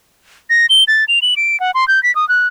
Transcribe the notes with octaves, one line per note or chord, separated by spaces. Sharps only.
A#6
G7
A6
F7
F#7
D7
F#5
C6
G6
B6
D#6
F#6